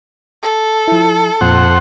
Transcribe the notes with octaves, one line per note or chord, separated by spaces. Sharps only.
A4
F3 E4
F2 A#2 C5 F#5